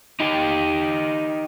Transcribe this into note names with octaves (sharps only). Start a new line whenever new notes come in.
D#4 G4